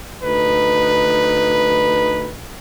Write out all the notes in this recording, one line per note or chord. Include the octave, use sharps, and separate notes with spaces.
D2 D#4 B4